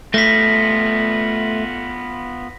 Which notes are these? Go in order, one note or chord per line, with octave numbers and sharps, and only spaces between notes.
A3 B3 F4 A#6 B6